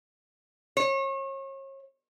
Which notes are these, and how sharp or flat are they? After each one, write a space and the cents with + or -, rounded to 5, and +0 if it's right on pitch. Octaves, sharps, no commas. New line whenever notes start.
C#5 -35